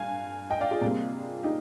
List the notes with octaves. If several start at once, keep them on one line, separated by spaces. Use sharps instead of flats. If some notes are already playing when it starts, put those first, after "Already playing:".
Already playing: G2 F5 G#5
D#5 G5
D5 F5
F4 G#4
C3 G3 A#3
D#4 G4